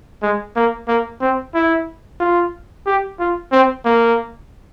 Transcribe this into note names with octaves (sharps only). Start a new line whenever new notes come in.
G#3
A#3
A#3
C4
E4
F4
G4
F4
C4
A#3